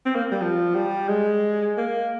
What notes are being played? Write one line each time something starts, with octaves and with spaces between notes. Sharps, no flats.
C4
A#3
G3
F3
G3
G#3
A#3